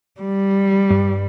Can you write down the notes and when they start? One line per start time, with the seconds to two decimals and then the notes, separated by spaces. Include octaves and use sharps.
0.21 G3
0.90 G2